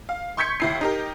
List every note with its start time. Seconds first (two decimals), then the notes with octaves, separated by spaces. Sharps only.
0.09 F5
0.37 C6 C#6 G6 G#6 B6 C#7
0.60 D#2 E4 C7
0.81 D#4 G4 A#4